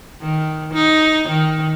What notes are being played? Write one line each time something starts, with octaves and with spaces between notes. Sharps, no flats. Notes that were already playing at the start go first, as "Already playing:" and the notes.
D#3
D#4
D#3